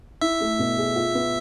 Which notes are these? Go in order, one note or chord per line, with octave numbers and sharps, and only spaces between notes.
E4 E5
A3
B2
G#4
F4
B3